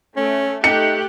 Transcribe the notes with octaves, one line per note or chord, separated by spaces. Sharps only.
A3 C#4
A3 D#4 G4 F#6 C#7